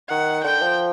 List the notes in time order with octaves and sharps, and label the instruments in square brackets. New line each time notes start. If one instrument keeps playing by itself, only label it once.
[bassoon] D#3 [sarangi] F#5
[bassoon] D3 [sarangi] G5
[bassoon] F3